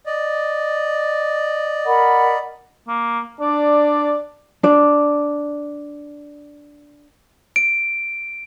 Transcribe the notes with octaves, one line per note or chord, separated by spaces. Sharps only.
D5 D#5
A#4 F#5 B5
A#3
D4 D5
D4 D5
D7